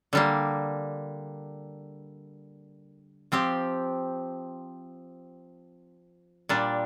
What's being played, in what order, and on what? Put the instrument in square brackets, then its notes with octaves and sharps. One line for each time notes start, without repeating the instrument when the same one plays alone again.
[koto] D3 G3 A#3
F3 C4 G4
A#2 G3 D4